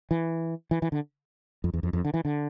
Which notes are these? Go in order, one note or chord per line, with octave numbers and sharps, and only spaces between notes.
E3
E3
E3
D3
F2
E2
F2
F2
D3
E3
D3